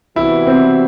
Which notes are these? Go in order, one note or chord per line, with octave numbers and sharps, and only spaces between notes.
C3 E3 G3 B3 E4 F#4
C4